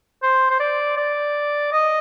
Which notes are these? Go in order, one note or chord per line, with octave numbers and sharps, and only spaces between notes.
C5
C5
D5
D5
D#5